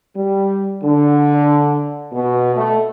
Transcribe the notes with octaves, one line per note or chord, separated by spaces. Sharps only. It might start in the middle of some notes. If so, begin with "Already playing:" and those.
G3
D3
B2
A3